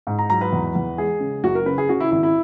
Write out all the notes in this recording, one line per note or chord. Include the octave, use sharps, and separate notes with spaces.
G#2
A#5
F#3 A#5
B4
E2
E2
G#3 G#4
C#3
F#1 F#4
A#4
C#3 B4
G#4
C#3 F#4
E4
G#1 E4
E4